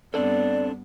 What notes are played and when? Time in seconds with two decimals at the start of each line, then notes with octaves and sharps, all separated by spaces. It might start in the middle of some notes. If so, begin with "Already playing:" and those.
0.14 G2 B3 C4 D4 A4 D5